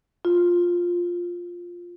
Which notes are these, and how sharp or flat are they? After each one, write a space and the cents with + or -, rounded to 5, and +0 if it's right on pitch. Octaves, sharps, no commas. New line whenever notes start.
F4 +5